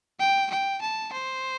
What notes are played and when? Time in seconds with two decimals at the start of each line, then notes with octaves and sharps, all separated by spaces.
0.20 G5
0.51 G5
0.82 A5
1.13 C5